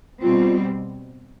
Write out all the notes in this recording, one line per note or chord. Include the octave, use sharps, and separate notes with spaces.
B2 G3 C4 F4